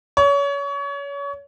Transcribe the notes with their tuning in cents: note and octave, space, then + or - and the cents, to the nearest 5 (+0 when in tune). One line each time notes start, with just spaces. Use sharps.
C#5 +30